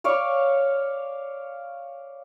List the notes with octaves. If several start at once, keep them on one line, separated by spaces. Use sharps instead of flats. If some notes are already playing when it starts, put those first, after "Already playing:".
C#5 D5 F5 C#6